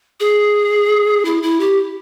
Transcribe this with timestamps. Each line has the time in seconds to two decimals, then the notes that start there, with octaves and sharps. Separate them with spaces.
0.20 G#4
1.25 E4
1.43 E4
1.60 G4